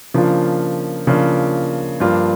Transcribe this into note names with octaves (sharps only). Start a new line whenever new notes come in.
C#3 F3 A#3 D4 F4
C#3 F3 A#3 D4 F4
G2 F3 A#3 D4 F4